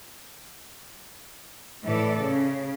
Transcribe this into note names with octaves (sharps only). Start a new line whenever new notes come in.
A2 E3 A4 D5
C#3